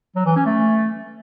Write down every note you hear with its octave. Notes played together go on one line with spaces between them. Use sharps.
F#3
E3
C#4
A3